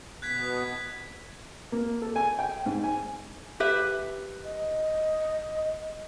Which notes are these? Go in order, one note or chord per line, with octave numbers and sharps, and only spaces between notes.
B2 B3 F#6 G#6 B6
A#3
A4
G#5
G5
G#2
G#5
G4 B4 E5
D#5